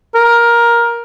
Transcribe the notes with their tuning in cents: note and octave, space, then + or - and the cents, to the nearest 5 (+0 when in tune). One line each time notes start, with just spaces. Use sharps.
A#4 +10